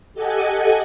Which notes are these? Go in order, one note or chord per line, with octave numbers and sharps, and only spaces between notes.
G4 A4 D#5 F#5 G#5